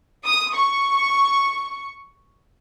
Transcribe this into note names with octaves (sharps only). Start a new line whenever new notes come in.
D#6
C#6